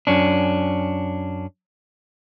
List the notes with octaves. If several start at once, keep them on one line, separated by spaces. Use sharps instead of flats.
F#2 C#4 D4